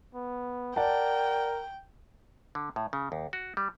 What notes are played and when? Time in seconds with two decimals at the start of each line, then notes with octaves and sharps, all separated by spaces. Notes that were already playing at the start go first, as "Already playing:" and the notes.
0.15 B3
0.76 A#4 D5 F#5 G5 A5
2.55 D3
2.76 A2
2.93 C#3
3.12 D#2
3.33 F#4
3.57 G3